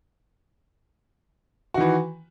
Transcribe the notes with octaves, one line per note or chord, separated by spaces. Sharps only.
D#3 E3 F#4